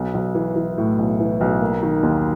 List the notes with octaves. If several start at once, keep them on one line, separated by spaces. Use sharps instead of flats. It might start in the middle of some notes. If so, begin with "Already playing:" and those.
Already playing: B1
B1
E3
E3
A2
B1
E3
B1
A#3
D#3
D#2